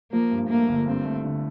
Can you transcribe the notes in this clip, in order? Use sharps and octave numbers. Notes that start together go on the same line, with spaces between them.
F3 A#3
G2
A3 A#3
G1
G2 C4
A3
D3